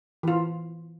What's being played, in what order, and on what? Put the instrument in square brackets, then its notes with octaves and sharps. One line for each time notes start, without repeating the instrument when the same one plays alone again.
[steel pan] E3 F4